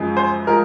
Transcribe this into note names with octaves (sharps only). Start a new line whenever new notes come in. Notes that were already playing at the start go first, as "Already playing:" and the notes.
Already playing: F#2 C#3 F3 G#3
C5
F3 G#3 A#4